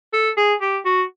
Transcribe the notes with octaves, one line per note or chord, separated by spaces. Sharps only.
A4
G#4
G4
F#4